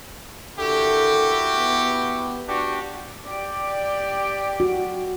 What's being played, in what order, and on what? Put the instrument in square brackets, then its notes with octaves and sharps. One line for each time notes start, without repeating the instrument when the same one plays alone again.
[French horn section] D3 A#3 A4 [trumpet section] E4 F#4 G4
[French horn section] B3
[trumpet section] D4 F#4 G4
[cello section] G4 D5
[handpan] F#4